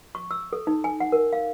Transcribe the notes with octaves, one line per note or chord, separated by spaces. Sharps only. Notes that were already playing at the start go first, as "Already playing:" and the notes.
C#6
E6
A4
D#4
G#5
F#5
A#4
F5